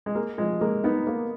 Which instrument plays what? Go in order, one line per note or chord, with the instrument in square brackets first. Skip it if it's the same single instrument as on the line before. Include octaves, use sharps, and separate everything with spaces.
[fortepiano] G#3
[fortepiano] A#3 [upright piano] G#4
[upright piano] F3 [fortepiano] G#3
[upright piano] G#3 [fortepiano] A#3
[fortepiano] B3 [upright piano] D#4
[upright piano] A#3